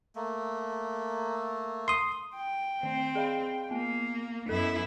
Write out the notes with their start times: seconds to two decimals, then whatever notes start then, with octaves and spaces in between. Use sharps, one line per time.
0.16 A3 A#3
1.88 C6 D#6
2.35 G5
2.83 D#3 C4
3.15 G#4 D#5 F5
3.71 A#3 B3
4.49 F#2 B3 E4 A4